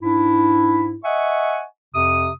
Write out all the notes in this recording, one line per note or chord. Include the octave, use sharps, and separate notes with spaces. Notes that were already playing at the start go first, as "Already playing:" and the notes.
G#2 D4 E4
D#5 E5 F#5 G#5 C#6
F2 C3 D#6